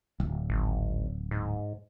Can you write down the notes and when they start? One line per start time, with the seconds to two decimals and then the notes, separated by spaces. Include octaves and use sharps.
0.20 D1 G1
0.50 G#1
1.31 G#2